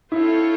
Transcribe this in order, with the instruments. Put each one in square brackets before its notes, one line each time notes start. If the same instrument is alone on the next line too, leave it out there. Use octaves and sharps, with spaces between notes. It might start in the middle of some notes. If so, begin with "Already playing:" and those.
[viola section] C4 F4 A4 C#5 [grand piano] E4